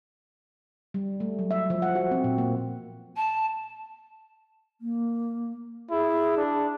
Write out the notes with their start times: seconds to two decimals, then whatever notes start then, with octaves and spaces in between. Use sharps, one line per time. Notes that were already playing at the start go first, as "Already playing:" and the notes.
0.94 G3
1.20 A3
1.39 F#3
1.51 E5
1.70 F3
1.82 F#5
1.95 F#4
2.11 C4
2.24 A#2
2.38 A#3
3.16 A5
4.81 A#3
5.90 E4 G#4
6.37 D4